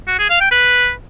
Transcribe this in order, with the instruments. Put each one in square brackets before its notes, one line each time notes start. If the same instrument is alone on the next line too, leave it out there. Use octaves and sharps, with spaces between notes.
[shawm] F#4
G#4
F5
G5
B4